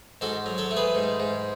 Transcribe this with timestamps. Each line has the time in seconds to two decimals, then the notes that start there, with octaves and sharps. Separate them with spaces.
0.21 G#2 F#4 A4
0.46 F#3
0.58 A4 C#5
0.71 A3
0.77 G#4 B4
0.95 G#2
1.20 G#2